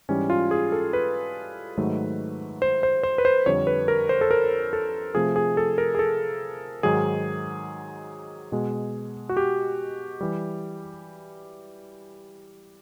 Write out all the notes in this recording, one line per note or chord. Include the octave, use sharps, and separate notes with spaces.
G#2 E3 G3 C#4
F4
G#4
A4
B4
G#2 D#3 F#3 A3
C5
C5
C5
B4
C5
F2 D3 G3 C#5
B4
A#4
C5
A4
A#4
A4
C3 F3 A3 G#4
G#4
A4
A#4
G#4
A4
G#2 D#3 F#3 G#4
B2 G#3
F#4
G4
E3 G3